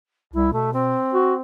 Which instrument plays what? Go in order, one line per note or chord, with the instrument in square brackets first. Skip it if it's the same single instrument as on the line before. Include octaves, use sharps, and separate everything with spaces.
[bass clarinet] C2 [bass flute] E4
[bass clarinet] B2 [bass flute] A3
[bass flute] C4
[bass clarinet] F#4